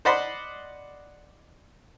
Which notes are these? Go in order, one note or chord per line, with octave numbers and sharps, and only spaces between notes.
C5 D5 D#5 F#5 B5 C6